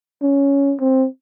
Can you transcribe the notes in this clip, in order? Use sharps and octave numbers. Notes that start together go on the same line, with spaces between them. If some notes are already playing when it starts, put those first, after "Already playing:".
C#4
C4